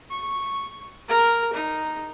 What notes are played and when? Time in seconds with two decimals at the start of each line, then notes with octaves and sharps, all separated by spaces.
0.11 C#6
1.09 A#4
1.53 D#4